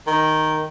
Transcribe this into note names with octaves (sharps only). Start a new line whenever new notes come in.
D#3